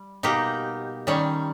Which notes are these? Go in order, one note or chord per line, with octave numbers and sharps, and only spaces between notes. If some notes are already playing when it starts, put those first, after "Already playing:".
Already playing: G3
B2 A#3 D#4 G4
D#3 G3 C#4